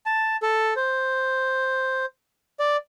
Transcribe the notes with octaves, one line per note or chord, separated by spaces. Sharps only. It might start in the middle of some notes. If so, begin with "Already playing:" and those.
A5
A4
C5
D5